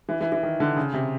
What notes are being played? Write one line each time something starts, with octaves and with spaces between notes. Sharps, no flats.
E3
E3
E3
D#3
D3
C#3
C3